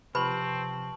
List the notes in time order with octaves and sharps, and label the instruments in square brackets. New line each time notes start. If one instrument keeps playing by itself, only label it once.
[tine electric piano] C3 F3 [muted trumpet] C4 [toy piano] B4 B5 [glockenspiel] A5 C#6 F#7